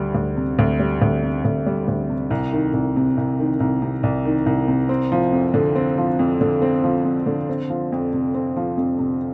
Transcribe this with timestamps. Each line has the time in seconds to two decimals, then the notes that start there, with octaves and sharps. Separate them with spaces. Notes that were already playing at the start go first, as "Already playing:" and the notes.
Already playing: D2 G3
0.15 D2
0.36 C3
0.59 D2
0.80 G3
1.02 D2
1.23 C3
1.45 D2
1.66 G3
1.88 D2
2.10 C3
2.30 C2
2.53 D#3
2.74 C2
2.96 C3
3.17 C2
3.39 D#3
3.60 C2
3.82 C3
4.03 C2
4.25 D#3
4.46 C2
4.68 C3
4.89 C4
5.12 F3
5.32 F2
5.54 D3
5.76 C4
5.98 F3
6.19 F2
6.41 D3
6.62 C4
6.84 F3
7.05 F2
7.26 D3
7.49 C4
7.70 F3
7.92 F2
8.13 C3
8.34 C4
8.57 F3
8.77 F2
8.99 C3